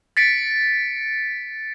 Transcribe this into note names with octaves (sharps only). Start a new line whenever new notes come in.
A6 B6 C#7 D7